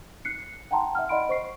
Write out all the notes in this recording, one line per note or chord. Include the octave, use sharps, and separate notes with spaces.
F#6 C7 C#7
F#5 G5 A5 A#5 C6
E5 F#5 F6
D5 D#5 F#5 B5 C6 D7
C5 C#6 C7